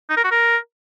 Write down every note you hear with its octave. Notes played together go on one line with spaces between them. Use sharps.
D#4
A#4
F#4
A#4